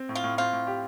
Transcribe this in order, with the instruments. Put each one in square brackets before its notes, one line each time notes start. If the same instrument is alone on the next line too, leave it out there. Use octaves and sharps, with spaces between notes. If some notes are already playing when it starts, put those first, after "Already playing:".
Already playing: [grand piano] C4
A2
[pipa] F4
[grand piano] A2
[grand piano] C4 [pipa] F4
[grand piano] A2
G4